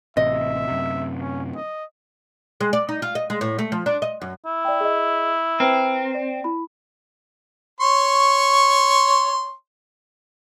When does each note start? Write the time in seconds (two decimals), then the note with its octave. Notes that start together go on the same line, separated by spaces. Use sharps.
0.17 A1 C3 D#5 E5
0.68 F#2 C3
1.21 C#4
1.56 D#5
2.61 G#3
2.73 D5
2.89 D#4
3.02 F4
3.15 D#5
3.30 G#3
3.41 A2
3.59 A3
3.72 F3
3.86 D4
4.02 D#5
4.22 F#2
4.46 E4
4.65 D5 G5
4.81 G#4 D#5
5.60 C4 B4 A#5 F6
6.14 D5
6.44 E4 B5
7.81 C#5 C6 C#6